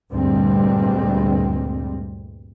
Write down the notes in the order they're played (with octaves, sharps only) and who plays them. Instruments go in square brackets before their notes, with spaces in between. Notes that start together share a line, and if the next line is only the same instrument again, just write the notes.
[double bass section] D2 G2 A#2 G3 G#3 C4